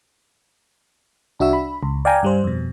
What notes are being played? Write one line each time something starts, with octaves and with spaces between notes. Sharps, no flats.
C2 D4 F#4 E5 E6
B5
C#2
D5 F5 G5 G#5 A#5
G2 G3 C5
F2 B2